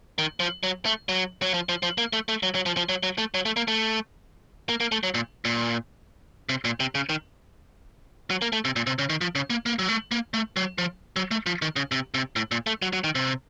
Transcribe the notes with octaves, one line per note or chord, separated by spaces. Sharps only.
D#3
F3
F#3
A3
F#3
F#3
F3
F3
F3
A#3
A3
A3
F#3
F#3
F3
F3
F#3
F#3
A3
F#3
A3
A#3
A3
A#3
A#3
A3
F#3
A#2
A#2
C3
A#2
C3
C#3
D#3
F#3
A#3
A3
C3
A#2
C3
C#3
D#3
F3
C#3
A#3
A#3
F#3
A3
A#3
A3
F#3
F3
F#3
A3
F3
D#3
C#3
C3
C3
A2
A#2
A3
F#3
F#3
D#3
C3